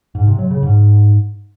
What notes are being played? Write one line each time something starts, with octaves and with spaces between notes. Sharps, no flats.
G#2
C3
F#3
C#3
G#2